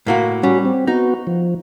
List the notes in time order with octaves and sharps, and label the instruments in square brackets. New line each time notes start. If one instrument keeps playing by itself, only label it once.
[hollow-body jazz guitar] A2 A#3 F#4
[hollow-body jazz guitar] G3 [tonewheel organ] C#4 F#4
[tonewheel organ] C4
[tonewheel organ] B3 F#4 [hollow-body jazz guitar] D#4
[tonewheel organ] F3